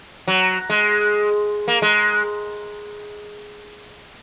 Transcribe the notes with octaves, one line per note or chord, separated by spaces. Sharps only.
F#3
G#3
A#3
G#3